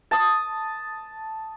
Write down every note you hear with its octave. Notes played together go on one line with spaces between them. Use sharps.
A5 D#6